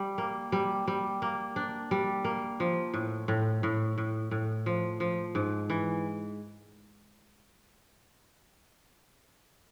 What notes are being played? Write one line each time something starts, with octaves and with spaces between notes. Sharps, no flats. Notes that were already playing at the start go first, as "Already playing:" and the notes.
Already playing: G3
A#3
G3
G3
A#3
D4
G3
A#3
F3
A2
A2
A2
A2
A2
F3
F3
G#2
E3